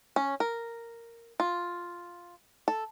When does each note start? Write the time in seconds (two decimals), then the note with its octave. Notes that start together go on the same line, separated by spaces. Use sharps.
0.16 C#4
0.40 A#4
1.40 F4
2.68 A4